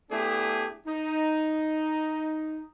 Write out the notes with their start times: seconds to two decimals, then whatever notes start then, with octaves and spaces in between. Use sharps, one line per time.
0.11 A3 B3 D4 E4 G4 G#4
0.87 D#4